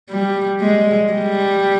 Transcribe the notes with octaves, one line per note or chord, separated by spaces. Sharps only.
G3
G#3
G3